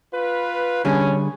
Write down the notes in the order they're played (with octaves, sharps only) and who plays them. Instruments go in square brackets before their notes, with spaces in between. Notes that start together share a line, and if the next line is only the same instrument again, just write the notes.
[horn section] F4 B4
[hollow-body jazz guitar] D3 G3 G#4 [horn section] C#4